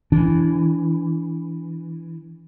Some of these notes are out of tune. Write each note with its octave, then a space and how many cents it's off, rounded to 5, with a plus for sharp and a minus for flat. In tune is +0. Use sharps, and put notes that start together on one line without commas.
E3 +0 D4 -30